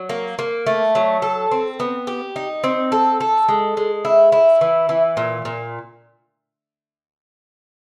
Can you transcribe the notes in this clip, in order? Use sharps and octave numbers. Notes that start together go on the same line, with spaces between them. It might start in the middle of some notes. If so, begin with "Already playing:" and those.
Already playing: F#3
A#3
A#3
A3
F#3
A4
C4
B3
G4
D#4
C4
A4
A4
G#3
G#3
E4
E4
E3
E3
A#2
A#2